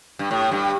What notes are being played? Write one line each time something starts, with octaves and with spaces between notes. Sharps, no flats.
G2
A2
G2